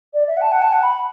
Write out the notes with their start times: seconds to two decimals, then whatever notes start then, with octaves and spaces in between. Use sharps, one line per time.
0.14 D5
0.27 E5
0.37 F#5
0.41 A5
0.52 F#5
0.62 A5
0.72 F#5
0.83 B5